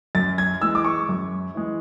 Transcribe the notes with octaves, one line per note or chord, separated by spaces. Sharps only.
F#2 A6
G#6
E3 G#3 E6
D6
C#6
F#2
E3 G#3